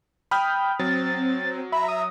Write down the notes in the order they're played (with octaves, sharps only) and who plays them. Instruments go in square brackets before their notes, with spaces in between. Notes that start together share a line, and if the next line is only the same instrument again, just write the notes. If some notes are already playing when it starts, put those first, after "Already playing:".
[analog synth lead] G5 [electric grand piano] B5 D#6 F6
[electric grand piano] F#3 [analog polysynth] C4 [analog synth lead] A6
[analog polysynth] E5 A#5 [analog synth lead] B5
[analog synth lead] D#6